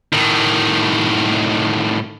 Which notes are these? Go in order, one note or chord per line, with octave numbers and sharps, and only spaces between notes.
A2 D#3